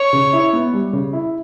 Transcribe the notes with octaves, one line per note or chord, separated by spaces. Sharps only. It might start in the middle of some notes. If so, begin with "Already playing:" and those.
Already playing: C#5
C#3
E4
B3
G3
C#3
E4